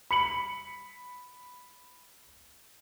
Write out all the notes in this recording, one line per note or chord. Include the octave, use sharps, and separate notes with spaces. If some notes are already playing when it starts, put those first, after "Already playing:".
B5 C#7 F#7